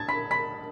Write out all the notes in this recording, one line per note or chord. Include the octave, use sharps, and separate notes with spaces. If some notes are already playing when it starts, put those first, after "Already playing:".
Already playing: A5 G#6 A6
B5 B6
B5 B6